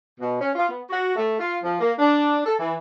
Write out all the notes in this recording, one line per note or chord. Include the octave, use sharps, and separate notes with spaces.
B2
C#4
F4
B3
F#4
A3
F4
F3
A#3
D4
A4
E3